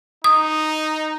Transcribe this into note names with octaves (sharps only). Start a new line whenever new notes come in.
D#4 D#6